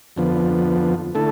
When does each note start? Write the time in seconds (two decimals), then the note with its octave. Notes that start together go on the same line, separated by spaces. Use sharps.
0.16 F2 D3 F3 B3
1.15 D3 A3 E4 A4